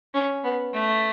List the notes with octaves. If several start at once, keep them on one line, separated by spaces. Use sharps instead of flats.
C#4
B3
A3